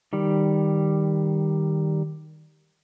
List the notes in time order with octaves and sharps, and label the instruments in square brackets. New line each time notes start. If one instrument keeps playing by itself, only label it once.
[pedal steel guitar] D#3 G3